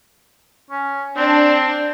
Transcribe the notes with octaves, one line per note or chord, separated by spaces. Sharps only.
C#4
C4 D4